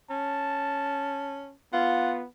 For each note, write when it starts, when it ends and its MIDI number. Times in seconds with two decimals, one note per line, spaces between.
0.10 1.53 61
0.10 1.52 81
1.73 2.27 59
1.73 2.22 65
1.73 2.13 78